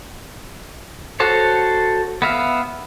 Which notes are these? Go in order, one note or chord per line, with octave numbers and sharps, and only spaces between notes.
F#4 A4 C5 C#5
B3 E5 F5